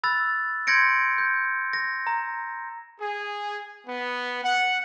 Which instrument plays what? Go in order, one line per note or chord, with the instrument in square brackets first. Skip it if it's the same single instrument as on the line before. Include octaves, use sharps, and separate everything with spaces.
[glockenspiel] B5 E6 F#6 A6
C6 G6 G#6 A#6 C#7 D7
G6
A#6
A#5
[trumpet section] G#4
B3
F#5